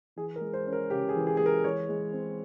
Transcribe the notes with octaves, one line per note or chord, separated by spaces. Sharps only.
E3 G#4
A#4
G#3
C5
C#4
A#4
C#3 G4
G#4
E3
G#4
G#3 G#4
A#4
E3 C#5
G#3
C4